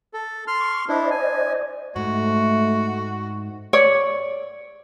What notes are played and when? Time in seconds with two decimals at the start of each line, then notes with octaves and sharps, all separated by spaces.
0.14 A4
0.47 C6 F6
0.61 C#6
0.89 D4 E4 C5 D5 D#5
1.11 G#5
1.96 G#2 A3 F#4
3.73 C#5 D5